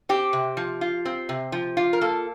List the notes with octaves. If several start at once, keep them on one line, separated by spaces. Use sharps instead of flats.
C4 G4
C3
F3
F4
C4
C3
F3
F4
A#4
A#3 A4